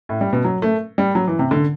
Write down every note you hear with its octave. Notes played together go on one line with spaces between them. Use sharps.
A2
G3
B2
F#3
A3
G3
F#3
E3
C3
D3